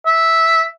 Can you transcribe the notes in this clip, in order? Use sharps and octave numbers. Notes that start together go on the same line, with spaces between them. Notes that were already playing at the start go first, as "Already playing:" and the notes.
E5